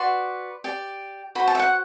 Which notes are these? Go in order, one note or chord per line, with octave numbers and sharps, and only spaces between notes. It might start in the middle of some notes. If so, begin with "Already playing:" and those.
Already playing: F#4 B4 D5 C6
G4 D5
F#4 C5 B5
A5
E5
F#5